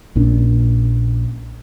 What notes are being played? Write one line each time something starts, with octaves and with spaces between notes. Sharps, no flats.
A#1 A#2 C#4 D4